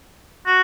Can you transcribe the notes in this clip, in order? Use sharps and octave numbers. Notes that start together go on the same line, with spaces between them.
F#4